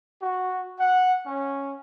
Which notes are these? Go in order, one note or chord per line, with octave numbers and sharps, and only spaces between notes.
F#4
F#5
C#4